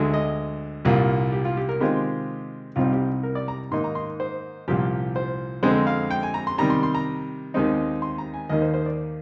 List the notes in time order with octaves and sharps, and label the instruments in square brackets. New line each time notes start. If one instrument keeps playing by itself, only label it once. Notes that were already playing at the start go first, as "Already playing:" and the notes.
Already playing: [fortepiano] D2 D3 G#3
D#5
C2 A#2 G3 A#3 F4
G4
F4
G4
A#4
C3 D#3 G#3 C4 F4 G4
C2 C3 G3 C4 D#4 F4
G4
A#4
D5
A#5
G#2 D#3 A#3 D#4 C6
A#5
C6
C5
C2 A#2 F3 G4
C5
F2 D3 G#3 C4 C5
F5
G5
G#5
A#5
C6
C3 D#3 G3 A#5
C6
C6
A#5
D#2 D#3 G#3 C4 D#4
C6
A#5
G#5
D#2 D#3 A#3 D#4 D#5
C5
C5
D5